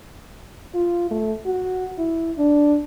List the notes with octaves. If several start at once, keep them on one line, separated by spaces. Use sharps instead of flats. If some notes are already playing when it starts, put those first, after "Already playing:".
F4
A3
F#4
E4
D4